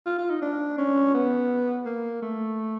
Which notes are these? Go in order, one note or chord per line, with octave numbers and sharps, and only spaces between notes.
F4
F4
D#4
D4
C#4
B3
A#3
A3